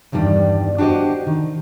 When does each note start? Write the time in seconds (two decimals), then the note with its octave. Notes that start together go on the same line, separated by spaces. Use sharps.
0.12 E2 G2 D#3 G3 D4
0.78 D4 F#4 G4 C5 D#5
1.27 D#3